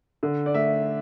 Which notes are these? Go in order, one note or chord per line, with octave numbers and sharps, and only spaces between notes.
D3
D5
A3 E5